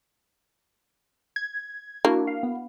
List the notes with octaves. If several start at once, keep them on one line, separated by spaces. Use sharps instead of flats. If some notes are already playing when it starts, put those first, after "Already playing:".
G#6
A#3 D4 E4 F#4
F5
B3